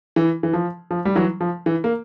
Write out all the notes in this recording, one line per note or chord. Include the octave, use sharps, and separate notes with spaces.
E3
E3
F3
F3
G3
E3 F#3
F3
E3
A#3